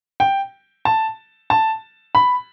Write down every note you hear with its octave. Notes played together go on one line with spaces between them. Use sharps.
G5
A5
A5
B5